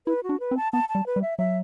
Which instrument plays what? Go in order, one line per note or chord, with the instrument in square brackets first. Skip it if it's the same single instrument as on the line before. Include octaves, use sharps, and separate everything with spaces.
[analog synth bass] E4 [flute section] B4
[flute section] F#4
[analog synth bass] D4
[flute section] B4
[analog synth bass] C4
[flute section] A5
[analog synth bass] B3 [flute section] A5
[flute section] A5
[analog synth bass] G3
[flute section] B4
[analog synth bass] G3
[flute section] E5
[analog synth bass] F#3 [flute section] E5